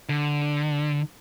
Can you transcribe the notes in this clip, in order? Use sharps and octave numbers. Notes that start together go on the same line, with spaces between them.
D3